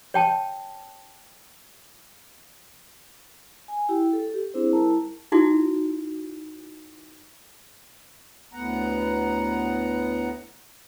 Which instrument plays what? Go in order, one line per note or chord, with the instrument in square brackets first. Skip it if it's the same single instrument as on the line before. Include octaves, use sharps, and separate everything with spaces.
[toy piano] C#5 G5 A5
[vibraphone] G#5
E4 G4 G5
A4
G4
C4 D4 E4 G#4 C5
G3 E4 A#4 A5 A#5
[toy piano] D#4 E4 F#4
[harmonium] D2 A2 B3 F#5 A#5